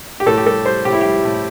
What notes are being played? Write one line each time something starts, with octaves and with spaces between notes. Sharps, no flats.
G4
A2 A4
G4
G3 A4
G3 C5
A2 G4
E4
G3 G4
A2